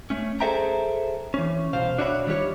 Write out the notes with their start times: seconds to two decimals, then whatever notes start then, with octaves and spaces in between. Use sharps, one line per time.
0.10 A3 C#4
0.40 G#4 A4 C5 E5 G5 A#5
1.34 E3 C#4
1.73 C2 B2 C5 F5
1.99 D4 F#4 C#5 E5 A#5 B5
2.27 D#3 G3 F4 G4 C#5